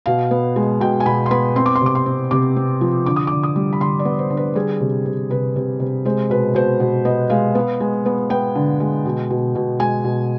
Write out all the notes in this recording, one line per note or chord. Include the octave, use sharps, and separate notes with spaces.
B2 F5
B3
G#3
B2 G5
G#5
B2 B5
C6
B3 B5
C4 C6
D6
C6
C3 D6
C6
C4
C3 D6
C4
F3
D3 D6
D#6
D3 D6
D#6
G3
B5
D3 C6
D5
B3
C5
D3
B4
G3 G#4
C3
C3
C3 B4
C3
C3
G#3 C5
B2 B4
B2 C5
B2
B3 D#5
G#3 F5
B3
G#3
B3
B3 G5
D3
G#3
B2
B2
B2
G#3 G#5
B2